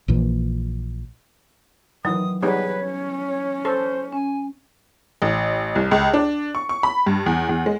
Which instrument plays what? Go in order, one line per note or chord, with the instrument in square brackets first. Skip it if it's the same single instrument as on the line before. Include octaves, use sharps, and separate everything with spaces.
[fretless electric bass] A#1 A#2 E3
[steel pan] D#3 E3 [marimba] F#3 [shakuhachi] D#6
[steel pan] G3 B3 D#4 [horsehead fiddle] G#4 B4 [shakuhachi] C#5
[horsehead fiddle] C#4
[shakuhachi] C#5
[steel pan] A4 [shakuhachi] C5
[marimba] C#4 [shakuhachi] G#5
[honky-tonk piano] A1
C2
C#2
D4
C#6
C#6
B5
G2
E2
E2
G#3